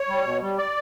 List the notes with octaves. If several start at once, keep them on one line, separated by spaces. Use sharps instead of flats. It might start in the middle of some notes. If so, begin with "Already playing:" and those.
Already playing: C#5
G3
B2
G3
D5